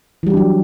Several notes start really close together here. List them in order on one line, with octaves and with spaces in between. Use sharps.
E3 G3 G4 D4 F#3